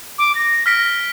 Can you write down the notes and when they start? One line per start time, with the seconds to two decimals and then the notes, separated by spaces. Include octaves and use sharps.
0.18 D6
0.35 A#6
0.66 F6 B6 D7